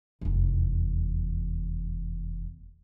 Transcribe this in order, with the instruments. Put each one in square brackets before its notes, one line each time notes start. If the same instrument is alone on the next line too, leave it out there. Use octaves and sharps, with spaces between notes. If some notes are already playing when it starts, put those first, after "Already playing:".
[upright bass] F1 E2